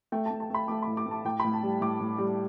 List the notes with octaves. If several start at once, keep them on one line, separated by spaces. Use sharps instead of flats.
A3 G5
A3 A5
A5
A3 B5
A3 D6
A2 B5
D6
A3
A5
A2 G5
A2 B5
A5
G3
A2 D6
A2
G3